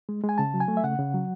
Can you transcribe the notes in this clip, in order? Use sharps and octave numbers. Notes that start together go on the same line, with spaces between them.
G#3
G#3
G#5
C#3 A5
F#3
G#5
A3
E5
C#3 F#5
C#3
F#3